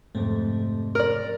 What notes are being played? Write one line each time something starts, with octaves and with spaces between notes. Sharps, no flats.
F2 G#2 C3 A3 C4
A#4 D5